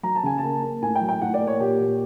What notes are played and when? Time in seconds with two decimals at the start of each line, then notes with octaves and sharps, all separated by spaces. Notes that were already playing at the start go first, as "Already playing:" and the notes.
0.03 F#3 A#5
0.16 A5
0.23 C#3 G#5
0.38 A5
0.43 A#3
0.63 A#3
0.82 A2 G#5
0.95 G5
1.01 F#3
1.09 G5
1.22 A2 F#5
1.34 D5
1.40 A#3
1.47 C#5
1.60 A#2 G4
1.80 A#2